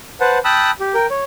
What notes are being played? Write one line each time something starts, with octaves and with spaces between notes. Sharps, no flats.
B4 C5 F#5 A5
G5 A5 B5 D#6 E6 F#6
G4
A#4 G5
C#5